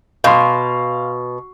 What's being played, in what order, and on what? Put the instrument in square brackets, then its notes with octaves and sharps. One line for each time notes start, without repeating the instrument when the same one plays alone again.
[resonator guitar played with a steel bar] B2 [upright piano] F5 C6